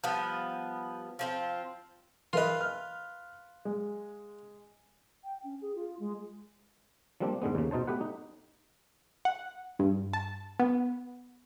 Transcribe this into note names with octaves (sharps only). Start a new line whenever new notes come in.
F3 G3 B3
F3 C4 F4
E3 F4 A#4 B4 D#5
F6
G#3
G5
C#4
G#4
F4
G#3
F3 G3 A#3 C4 D4
G#2 D3 G#3 B3
D#2 C#3
B2 D#4 C5 A5
A3 B3 G4 B4 F#5
D#4
F#5
G2
A5
B3